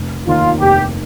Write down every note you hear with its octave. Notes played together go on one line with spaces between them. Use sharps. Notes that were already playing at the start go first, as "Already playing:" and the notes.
Already playing: F1
D#2 D#3 A#3 D#4 F4
F1 G4